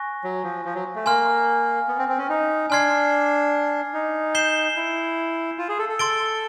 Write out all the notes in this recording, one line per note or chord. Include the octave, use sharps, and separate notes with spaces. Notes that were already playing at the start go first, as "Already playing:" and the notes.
Already playing: G#5 C#6 F#6 A#6
F#3
F3
F3
F#3
A3
A#3 G#5 C6 F6
B3
C4
C4
C#4
D#4
D4 G#5 C6 F6 G#6 C7
D#4
G6 C7 E7 G7
E4
F4
G#4
A4
A4
C6 E6 A6 D7 G7